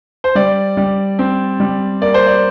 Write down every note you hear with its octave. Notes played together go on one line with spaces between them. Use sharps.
C5
G3 D5
G3
C4
G3
A#3 D5
C5
D5